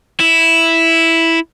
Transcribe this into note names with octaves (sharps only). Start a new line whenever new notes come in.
E4